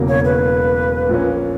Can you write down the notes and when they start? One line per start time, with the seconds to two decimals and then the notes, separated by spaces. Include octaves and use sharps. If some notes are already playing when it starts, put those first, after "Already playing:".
Already playing: E1 E2 C#3 F#3 A#3
0.08 C#5
0.25 B4
1.09 A#1 A#2 A#3 C#4